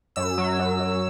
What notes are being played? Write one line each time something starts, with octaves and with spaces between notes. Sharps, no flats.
F#2 E6
F#3
F#2
F#2